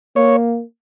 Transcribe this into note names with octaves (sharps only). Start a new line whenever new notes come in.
A#3 C#5